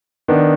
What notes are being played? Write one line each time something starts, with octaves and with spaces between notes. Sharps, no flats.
D#3 B3 D4